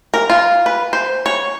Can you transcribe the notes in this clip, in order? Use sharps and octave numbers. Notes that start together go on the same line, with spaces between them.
A#4
F4
B4
C5
C#5